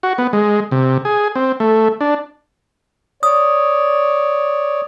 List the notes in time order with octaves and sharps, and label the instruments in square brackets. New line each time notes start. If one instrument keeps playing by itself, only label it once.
[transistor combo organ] F#4
B3
G#3
C3
G#4
C4
A3
D4
[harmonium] C#5 D5 [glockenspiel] D#6